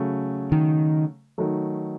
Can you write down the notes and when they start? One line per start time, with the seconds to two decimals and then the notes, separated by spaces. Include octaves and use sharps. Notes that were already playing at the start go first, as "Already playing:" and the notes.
Already playing: C#3 F#3 A3
0.52 D#3
1.38 D#3 F#3 A3